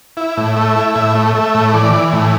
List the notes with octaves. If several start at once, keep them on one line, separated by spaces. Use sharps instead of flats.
E4
A2
A3 E5
E4
A2 E5
A3
A3 E5
A2
E3 D5
E3
A2